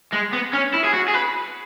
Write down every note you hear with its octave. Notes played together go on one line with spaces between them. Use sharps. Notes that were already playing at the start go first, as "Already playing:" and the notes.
G#3
B3
C#4
E4
G#4
F#4
G#4
B4